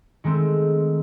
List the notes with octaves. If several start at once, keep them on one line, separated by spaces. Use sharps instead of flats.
D#3 G#3 A3 C4